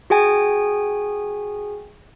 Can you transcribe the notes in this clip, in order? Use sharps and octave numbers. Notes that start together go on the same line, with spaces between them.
F#4 G#4 G5 G#5